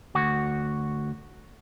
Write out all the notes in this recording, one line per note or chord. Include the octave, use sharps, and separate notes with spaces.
D2 F#4